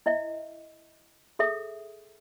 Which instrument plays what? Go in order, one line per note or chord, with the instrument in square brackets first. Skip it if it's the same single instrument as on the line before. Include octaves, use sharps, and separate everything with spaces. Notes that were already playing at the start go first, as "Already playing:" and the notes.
[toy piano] E4 D#5 E5
G#4 A4 E5 D#6